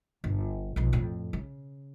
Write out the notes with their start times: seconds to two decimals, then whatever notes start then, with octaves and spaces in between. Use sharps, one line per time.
0.24 G1
0.76 B1 F3
0.93 F2 A2
1.33 C#3